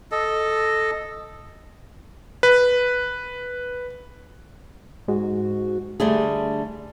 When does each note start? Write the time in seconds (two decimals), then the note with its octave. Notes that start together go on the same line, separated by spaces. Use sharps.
0.12 A4 D#5
2.43 B4
5.08 G#2 F#4
6.00 D3 G3 A3 G#4